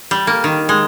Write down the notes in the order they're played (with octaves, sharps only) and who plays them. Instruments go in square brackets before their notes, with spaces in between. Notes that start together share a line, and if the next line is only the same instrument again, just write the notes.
[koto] G3
A#3
D#3
G#3